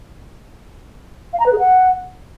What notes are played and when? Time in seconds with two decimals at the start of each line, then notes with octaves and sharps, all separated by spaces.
1.33 F5
1.40 A#5
1.46 B4
1.53 G#4
1.59 F#5